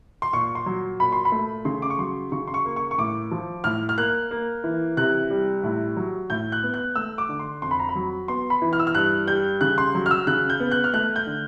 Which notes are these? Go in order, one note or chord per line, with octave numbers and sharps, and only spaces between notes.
C6
A#2 C#6
C6
F#3
A#2 B5
C6
B5
A3
C#3 C6
D6
C#6
F#3 C6
C#3 C#6
C6
C#6
A#3
C#6
C#6
A2 D6
F3
A2 F6
F6
A#3 F#6
A#3
E3
C3 F#6
G3
A2
F#3
A2 G6
F#6
B3
F#6
A3 E6
D6
D3
C6
F2 C6
B5
A#5
B5
F#3
B3 C6
B5
E3
F6
E6
F6
G2 F#6
G3 G6
C#3 F#6
C6
F#3
F6
E6
C#3 F#6
G6
B3
F#6
F6
A3 F#6
G6
D3